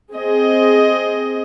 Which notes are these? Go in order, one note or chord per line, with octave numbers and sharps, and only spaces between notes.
C4 G#4 D#5